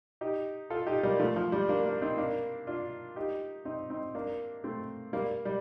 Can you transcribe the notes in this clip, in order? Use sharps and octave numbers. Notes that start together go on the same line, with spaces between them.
D#4 G4
F4 A4
D#4 G4
G3 A#3
F3 A3
F3
G3
A#3 D4
A#3 D4
C4 D#4
A#3 D4
D4 F4
D#4 G4
C4 D#4
C4 D#4
A#3 D4
A3 C4
G3 A#3
G3